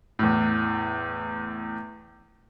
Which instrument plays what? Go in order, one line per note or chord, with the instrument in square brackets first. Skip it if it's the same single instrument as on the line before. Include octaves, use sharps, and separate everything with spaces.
[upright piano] E2 A2